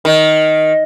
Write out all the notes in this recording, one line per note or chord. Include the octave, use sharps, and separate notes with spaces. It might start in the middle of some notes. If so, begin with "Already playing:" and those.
D#3